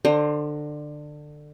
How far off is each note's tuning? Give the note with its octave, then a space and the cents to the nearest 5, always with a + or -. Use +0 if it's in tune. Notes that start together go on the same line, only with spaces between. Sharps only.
D3 +20 C5 +25 A#5 +0